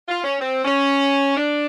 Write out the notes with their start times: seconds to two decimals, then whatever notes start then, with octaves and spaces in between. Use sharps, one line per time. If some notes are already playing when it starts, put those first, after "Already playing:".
0.09 F4
0.24 C#4
0.41 C4
0.65 C#4
1.37 D4